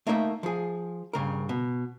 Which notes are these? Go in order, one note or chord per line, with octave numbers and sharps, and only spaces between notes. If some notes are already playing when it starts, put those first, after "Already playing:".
A3 A#3 D#4 A#4 B4 E5
F3 G#4
G2 C#3 A#4
B2